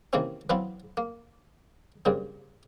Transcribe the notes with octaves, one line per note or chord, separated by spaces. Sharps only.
C3 D#3 E3 A#3 C4 C#4
E3 F#3 B3 C4 E4 F4
A#3
G2 A#2 C#3 C4